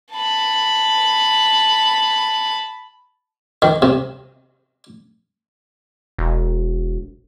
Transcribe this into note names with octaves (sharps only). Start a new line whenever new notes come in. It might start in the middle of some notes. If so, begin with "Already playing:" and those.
A5 B5
D#3
C3
E1